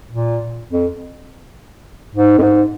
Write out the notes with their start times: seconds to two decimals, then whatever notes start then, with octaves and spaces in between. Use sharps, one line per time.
0.10 A#2
0.72 F2
2.16 G#2
2.38 F2
2.43 G#2